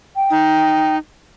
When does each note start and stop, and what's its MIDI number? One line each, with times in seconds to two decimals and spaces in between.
0.16 0.96 79
0.30 0.98 63